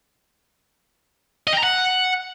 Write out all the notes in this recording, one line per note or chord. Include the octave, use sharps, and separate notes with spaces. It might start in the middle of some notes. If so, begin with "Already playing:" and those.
D#5
G5
A#5
F#5